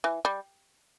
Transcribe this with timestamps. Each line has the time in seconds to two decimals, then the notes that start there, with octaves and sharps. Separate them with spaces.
0.04 E3
0.25 G3